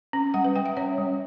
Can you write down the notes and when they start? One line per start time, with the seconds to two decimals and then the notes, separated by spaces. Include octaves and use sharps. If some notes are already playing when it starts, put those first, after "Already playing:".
0.13 C#4
0.34 G3 F#5
0.44 B4
0.56 G3 G5
0.66 E5
0.77 C#4 C#5
0.98 G3